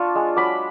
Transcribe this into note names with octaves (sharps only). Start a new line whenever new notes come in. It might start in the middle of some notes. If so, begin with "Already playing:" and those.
Already playing: D4 F4 A5 C#6
G#3
F#3 B5 D6